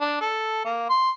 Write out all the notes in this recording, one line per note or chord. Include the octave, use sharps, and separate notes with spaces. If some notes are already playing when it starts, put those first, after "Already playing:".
D4
A4
A#3
C6